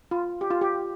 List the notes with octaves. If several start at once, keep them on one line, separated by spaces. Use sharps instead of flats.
F4
G4
F4
G4